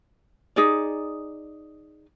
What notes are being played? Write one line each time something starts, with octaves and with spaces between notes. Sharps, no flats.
D#4 G#4 D5